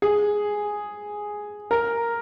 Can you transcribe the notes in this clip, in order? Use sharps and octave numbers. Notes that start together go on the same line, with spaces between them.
G#4
A#4